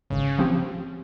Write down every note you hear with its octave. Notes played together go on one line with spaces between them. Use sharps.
G#1 C#3
F3 C4 G4